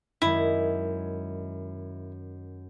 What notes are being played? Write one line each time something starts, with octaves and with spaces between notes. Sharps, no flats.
F#2 D#3 G#3 E4